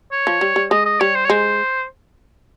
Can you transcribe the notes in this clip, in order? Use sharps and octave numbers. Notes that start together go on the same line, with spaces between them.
C#5
F3
G3
G3
G#3 D#5
D#5
G3 C#5
C5
C#5
G#3 C5